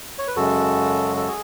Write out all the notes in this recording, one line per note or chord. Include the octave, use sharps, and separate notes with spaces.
C#5
B4
F#2 C#3 G#3 F#4 A4
A4
G#4